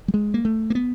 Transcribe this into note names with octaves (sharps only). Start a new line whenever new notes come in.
G3
G#3
A#3
A3
A#3
B3